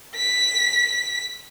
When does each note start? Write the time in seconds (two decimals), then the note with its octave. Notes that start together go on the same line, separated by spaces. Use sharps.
0.16 B6